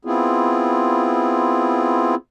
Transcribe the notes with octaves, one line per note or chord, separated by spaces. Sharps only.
B3 C4 E4 F4 G#4